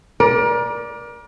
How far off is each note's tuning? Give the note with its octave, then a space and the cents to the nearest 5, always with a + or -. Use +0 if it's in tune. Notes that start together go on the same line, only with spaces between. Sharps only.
A#4 +35 D5 +0